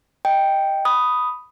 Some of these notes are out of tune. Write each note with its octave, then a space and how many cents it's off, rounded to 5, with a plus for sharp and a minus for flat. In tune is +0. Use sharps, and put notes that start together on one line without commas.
D#5 +0 G5 +0
B5 +0 D#6 +0